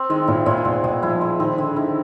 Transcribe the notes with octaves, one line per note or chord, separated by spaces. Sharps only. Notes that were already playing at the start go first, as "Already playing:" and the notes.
Already playing: C4
D#3 G#3
A#2 E4
A#2 G#3
B2 C4
B2 G#3
F3 E4
G#3
D#3 C4
D3 G#3
D#3 E4